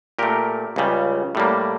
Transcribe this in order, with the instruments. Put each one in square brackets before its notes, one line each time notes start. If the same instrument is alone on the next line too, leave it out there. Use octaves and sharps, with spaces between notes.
[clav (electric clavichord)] A#2 A3 G4 A#4
C#2 C#3 G3
A2 G3 A#3